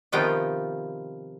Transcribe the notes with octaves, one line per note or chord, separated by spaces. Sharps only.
C3 D#3 F3 B3 F4 G5